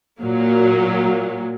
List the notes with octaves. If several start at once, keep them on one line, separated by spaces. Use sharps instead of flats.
A#2 F#3 A#3